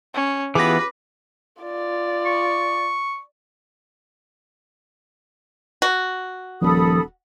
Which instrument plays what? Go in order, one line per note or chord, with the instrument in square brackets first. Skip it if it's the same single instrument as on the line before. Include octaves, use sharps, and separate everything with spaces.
[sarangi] C#4
[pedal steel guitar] E3 B3 [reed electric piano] F4 G4 G#4 [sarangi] B4 [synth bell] D6 A#6
[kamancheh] F4 D5
[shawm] C#6
[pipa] F#4
[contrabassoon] D#1 [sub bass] F3 [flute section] A4 B5 D#6